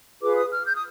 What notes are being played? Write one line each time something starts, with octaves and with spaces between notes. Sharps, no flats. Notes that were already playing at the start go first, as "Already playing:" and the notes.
F4 G#4 B4 D6
D#6
F6
G6
D#6